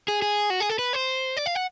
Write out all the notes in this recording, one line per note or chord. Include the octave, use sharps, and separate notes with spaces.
G#4
G#4
F#4
G#4
A4
B4
C5
D5
F5
F#5